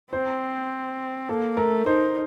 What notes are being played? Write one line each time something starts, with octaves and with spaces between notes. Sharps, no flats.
C4 C5
A#3 A4
A3 A#4
D#4 C5